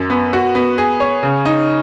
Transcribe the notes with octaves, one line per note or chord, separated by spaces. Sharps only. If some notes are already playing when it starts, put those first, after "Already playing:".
Already playing: F#2
B3
F#4
B3
G#4
C#5
C#3
D#4